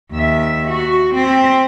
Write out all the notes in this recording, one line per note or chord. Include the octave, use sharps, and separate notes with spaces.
D#2 E5
F#4
C4